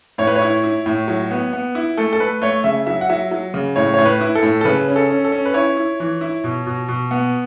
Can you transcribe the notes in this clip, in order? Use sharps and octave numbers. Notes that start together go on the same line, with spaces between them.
A2 C#5
B4
C#5
E4
E4
A2
F#3
B3
B3
E4
A3 A4
A4
A3 B4
A3 C#5
C#3 E5
F#3 E5
F#5
F#3 E5
F#3
C#3
A2 C#5
A2 C#5
B4
E4
A4
A2
A4
C#3 B4
C#4
A4
C#4
A4
C#4
B4
E4 C#5
E4
E3
E4
B2
B2
B2
B3